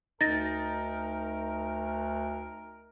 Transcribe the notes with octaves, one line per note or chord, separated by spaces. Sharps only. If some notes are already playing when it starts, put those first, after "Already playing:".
D2 D#4 A#4 A6 A#6